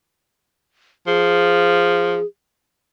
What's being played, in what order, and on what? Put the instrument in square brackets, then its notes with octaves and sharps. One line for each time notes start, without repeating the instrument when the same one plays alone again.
[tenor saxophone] F3 [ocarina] G#4